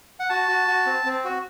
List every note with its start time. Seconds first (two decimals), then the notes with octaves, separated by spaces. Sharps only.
0.20 F#5
0.30 F#4 A5
0.48 F#4
0.68 F#4
0.86 C4
1.05 C4
1.25 F#4